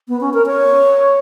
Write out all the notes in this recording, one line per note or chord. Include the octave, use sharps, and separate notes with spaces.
B3
C#4
A#4
C#5